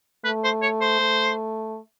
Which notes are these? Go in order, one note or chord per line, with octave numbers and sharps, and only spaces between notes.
A3 B4
C5
C#5
C5
A3